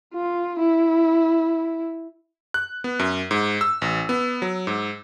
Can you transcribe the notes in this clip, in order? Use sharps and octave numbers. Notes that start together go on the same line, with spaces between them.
F4
E4
F#6
B3
F#2
G#2
E6
A1
B3
F#3
G#2